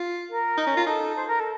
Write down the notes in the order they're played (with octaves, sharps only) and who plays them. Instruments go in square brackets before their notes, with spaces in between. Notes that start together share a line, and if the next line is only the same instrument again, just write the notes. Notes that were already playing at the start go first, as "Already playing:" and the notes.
Already playing: [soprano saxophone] F4
[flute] A#4
[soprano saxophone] D#4
C#4
F4
[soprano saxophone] D#4 [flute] A4
[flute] C5
A#4
A4